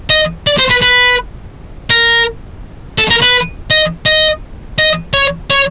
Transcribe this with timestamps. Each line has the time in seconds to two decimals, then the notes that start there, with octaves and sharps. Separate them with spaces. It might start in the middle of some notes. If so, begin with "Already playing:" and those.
0.10 D#5
0.47 D5
0.59 C5
0.70 B4
0.82 B4
1.90 A#4
2.98 A4
3.10 A#4
3.22 B4
3.71 D#5
4.06 D#5
4.78 D#5
5.13 C#5
5.50 C#5